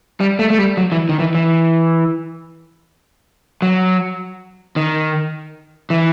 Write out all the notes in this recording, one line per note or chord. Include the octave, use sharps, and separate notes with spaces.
G3
A3
A3
G3
F#3
E3
D#3
E3
E3
F#3
D#3
E3